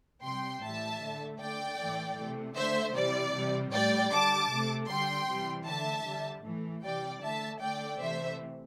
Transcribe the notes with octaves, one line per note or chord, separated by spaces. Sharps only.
C3 G3 G5 C6
A2 E3 G3 E5 A5
D3 A3
D3 A3 D5 G5
A2 E3 A3
A3
C3
D3 A3 C5 E5
C3 E3 G3 D5
C3 G3
A2 G3 D5 G5
D3 G3 A5 D6
C3 A3
D3 G3 G5 C6
C3 E3 G3
D3 A3 E5 A5
D3 G3
A2 E3 A3
C3 E3 G3 D5 G5
D3 A3 E5 A5
D3 A3 D5 G5
C3 E3 A3 C5 E5